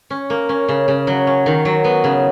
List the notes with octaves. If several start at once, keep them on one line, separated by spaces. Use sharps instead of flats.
C#4
A#3
C#4
C#3
C#3
F#3
C#4
D#3
F#3
B3
C#3